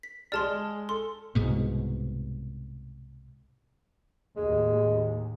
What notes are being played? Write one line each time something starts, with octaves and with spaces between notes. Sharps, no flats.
B6
G#3 G#4 D5 A5 C6 F6
A4 C6
C2 G#2 B2
D#2 A2 G#3